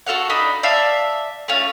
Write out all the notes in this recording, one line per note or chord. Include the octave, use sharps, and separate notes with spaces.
F#4 A4 F5 F#5
D4 D#4 B5
D5 E5 F5 A5
A3 C#4 F4